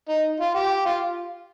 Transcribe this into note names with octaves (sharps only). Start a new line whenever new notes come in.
D#4
F4
G4
F4